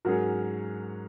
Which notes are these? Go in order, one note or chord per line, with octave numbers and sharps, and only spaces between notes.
G#2 F#3 C#4 F#4 G#4 A#4